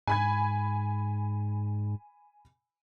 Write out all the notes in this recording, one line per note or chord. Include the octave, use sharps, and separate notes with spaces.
G#2 G#5 B5 G#6